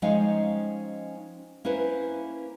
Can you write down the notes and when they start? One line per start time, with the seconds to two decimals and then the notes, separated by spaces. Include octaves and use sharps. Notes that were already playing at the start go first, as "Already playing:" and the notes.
0.02 F3 G#3 C#4 D#4 F5 G5
1.65 A#3 C#4 E4 B4 C5